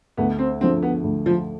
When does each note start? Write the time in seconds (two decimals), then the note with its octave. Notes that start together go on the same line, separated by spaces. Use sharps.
0.17 D2 B3
0.39 C4
0.61 D3 F3 C4
0.83 B3
1.04 D2
1.26 F3